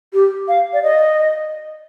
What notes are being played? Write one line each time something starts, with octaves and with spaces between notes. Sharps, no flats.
G4
F5
D5
D#5